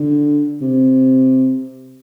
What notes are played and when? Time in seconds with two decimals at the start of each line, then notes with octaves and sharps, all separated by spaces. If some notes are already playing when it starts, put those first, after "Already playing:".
Already playing: D3
0.61 C3